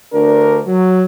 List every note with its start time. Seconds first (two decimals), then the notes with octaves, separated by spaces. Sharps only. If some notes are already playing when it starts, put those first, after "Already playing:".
0.13 D2 D4 A#4
0.67 F#3